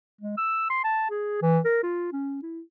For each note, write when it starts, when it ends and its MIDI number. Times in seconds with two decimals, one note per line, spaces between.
0.21 0.37 56
0.37 0.70 88
0.70 0.82 84
0.84 1.06 81
1.10 1.38 68
1.42 1.59 52
1.65 1.80 70
1.83 2.10 65
2.12 2.41 61
2.43 2.61 64